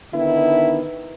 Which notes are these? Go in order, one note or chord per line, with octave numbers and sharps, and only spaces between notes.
D3 D#3 B3 E4